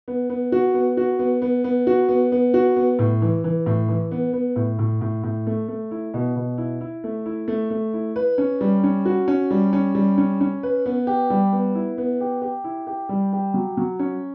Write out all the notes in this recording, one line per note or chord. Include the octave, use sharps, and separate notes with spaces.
B3
B3
F#4
B3
F#4
B3
B3
B3
F#4
B3
B3
F#4
B3
A2
E3
E3
A2
E3
B3
B3
A2
A2
A2
A2
A3
A3
E4
B2
B2
E4
E4
A3
E4
A3
A3
E4
B4
C#4
G3
C#4
F#4
C#4
G3
C#4
G3
C#4
C#4
B4
B3
G4
G3
B3
E4
B3
G4
G4
E4
G4
G3
G4
F#3
F#3
C#4